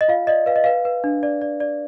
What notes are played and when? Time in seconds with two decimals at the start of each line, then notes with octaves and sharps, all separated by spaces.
0.01 D#5
0.08 F4 F5
0.27 D5 D#5
0.46 B4 F5
0.56 D#5
0.64 B4 F5
0.85 B4
1.04 D4
1.23 D5
1.42 D5
1.60 D5